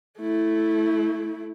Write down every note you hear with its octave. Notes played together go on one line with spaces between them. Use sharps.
A3 E4